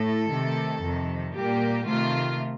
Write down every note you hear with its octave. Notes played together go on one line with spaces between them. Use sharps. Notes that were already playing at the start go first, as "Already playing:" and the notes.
Already playing: A2 A3 A4
C3 D#3 A3
F2 C3 D#3
A#2 G3 A#3 G4
C3 D#3 A3 F4